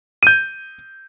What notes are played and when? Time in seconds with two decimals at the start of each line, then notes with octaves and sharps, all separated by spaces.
0.23 G6 D#7